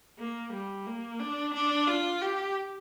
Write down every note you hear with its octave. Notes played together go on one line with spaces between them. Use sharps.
A#3
G3
A#3
D4
D4
F4
G4